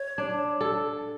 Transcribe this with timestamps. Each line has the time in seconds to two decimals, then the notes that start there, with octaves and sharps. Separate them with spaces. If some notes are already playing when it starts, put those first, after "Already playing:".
Already playing: C#5
0.18 D4
0.61 A4